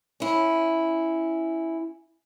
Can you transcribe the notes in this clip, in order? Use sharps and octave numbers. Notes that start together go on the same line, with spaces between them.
C#4 E4